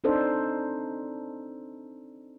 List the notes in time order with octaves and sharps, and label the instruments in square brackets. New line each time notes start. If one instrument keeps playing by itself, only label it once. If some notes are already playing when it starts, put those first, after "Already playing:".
[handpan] C4 D4 D#4 A4 C5